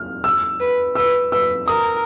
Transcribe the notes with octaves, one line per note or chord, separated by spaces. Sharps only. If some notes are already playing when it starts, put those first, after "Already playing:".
Already playing: F6
E6
B4
B4 E6
B4 E6
A#4 D#6